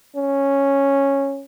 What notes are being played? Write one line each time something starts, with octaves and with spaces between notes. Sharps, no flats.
C#4